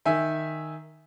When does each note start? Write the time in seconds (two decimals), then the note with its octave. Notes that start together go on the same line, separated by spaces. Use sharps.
0.05 D#3 E5 G#5